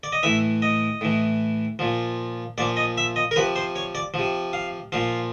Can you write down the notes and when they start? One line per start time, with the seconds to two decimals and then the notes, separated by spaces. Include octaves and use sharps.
0.03 D5
0.12 D#5
0.23 A2 E3 E5
0.62 D#5
1.01 A2 E3
1.79 A#2 F3
2.58 A#2 F3 D5
2.77 D#5
2.97 E5
3.16 D#5
3.31 A#4
3.36 C3 F3 B4
3.56 C5
3.76 C#5
3.95 D5
4.14 F3
4.19 C3
4.53 F5
4.92 A#2 F3 F5